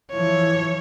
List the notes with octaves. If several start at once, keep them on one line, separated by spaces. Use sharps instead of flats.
E3 F3 C#5